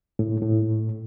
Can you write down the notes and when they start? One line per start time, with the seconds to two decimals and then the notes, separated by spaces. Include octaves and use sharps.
0.19 A2
0.42 A2